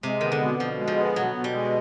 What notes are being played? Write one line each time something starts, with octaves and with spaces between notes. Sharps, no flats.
C3 G#3
D#3 B3
D3
B2
B2 F3
G#3
F3
B3
B2 F#3
B2
G3
G#3